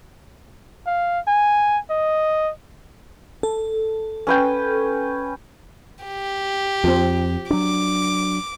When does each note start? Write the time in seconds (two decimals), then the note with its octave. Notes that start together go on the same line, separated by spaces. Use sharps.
0.86 F5
1.27 G#5
1.90 D#5
3.43 A4
4.27 C#4 B4 G5
6.05 G4
6.84 F2 F3 C4
7.51 F#3 D4 D6